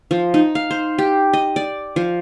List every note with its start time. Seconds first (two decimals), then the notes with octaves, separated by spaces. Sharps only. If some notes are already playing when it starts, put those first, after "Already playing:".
0.11 F3
0.34 D#4
0.55 F5
0.71 C5
0.98 G4
1.33 D#5
1.56 D5
1.96 F3